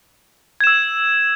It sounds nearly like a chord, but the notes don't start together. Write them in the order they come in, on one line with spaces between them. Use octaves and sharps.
G#6 E7 E6